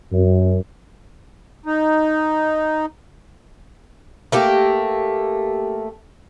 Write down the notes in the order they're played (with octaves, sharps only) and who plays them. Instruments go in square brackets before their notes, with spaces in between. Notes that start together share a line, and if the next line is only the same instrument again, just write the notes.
[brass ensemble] F#2
[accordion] D#4
[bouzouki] A3 A#3 G4